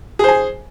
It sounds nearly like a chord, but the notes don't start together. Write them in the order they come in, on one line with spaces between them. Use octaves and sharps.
G#4 C5 G#5